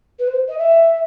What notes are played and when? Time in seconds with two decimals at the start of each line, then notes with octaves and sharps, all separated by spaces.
0.19 B4
0.28 C5
0.48 D#5
0.58 E5